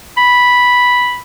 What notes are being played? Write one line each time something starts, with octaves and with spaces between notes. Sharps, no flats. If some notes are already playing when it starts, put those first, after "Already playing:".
B5